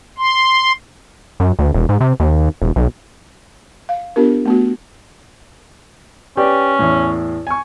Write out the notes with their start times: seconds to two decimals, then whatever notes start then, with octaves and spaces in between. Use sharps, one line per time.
0.18 C6
1.40 F#2
1.59 D2
1.74 E1
1.89 G#2
2.00 C3
2.20 D#2
2.62 E1
2.76 B1
3.89 F5
4.16 B3 D4 F4 G4 A#4
4.46 A3 B3 F#4
6.37 C#4 G4 B4 D5
6.79 E2 A2
7.47 G#5 C#6